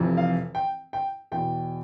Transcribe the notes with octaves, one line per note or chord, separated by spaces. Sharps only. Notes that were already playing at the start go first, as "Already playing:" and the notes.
Already playing: F1 F2 C3 E3
F5
G5
G5
E2 B2 G5